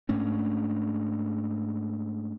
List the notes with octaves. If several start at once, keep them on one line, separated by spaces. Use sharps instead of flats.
G#2 A3 C#4 D4